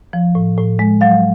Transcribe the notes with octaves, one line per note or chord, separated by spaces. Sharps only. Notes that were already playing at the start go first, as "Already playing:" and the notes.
F3
A2
A2
G#3
F#3 F5